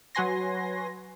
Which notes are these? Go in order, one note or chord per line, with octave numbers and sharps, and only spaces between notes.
F#3 F#4 B4 G#5 C6 A#6